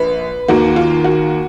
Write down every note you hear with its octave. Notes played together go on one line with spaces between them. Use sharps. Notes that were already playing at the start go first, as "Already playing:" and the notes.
Already playing: A#1 B4
D#2 D#3 A#3 F#4
F4
F#4